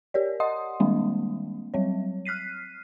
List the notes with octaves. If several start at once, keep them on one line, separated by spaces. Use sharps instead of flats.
G4 A#4 C#5 D5
D#5 F#5 C6 D#6
D#3 G3 G#3 A#3 C4 D4
F#3 G3 C4 C#5
F6 F#6 B6 C7 D#7